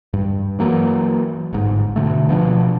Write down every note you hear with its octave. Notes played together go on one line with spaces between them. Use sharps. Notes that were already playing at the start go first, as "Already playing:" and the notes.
G2
E3 F#3 A#3
G1 G#2
B2 D3 A3
B2 F3 D4